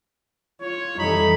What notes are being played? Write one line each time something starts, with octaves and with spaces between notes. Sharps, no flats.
F4 C#5
F2 E3 G3 D#4 A4 B5